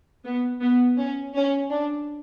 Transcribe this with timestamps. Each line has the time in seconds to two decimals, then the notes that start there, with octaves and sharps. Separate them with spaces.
0.24 B3
0.62 B3
0.98 C#4
1.35 C#4
1.71 D4